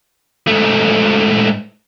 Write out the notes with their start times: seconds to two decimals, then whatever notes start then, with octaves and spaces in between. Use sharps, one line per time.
0.47 G#2 A3